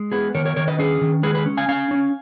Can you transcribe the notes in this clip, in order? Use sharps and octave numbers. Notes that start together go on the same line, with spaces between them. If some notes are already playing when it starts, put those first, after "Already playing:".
Already playing: G#3
B3 G#4 B4
D#3 A#4 C#5
A#4 C#5
D#3 A#4 C#5
B4 D#5
C#4 G#4 B4
D#3
G#3 G#4 B4
G#4 B4
C#4
F5 G#5
C#4 F5 G#5
C#4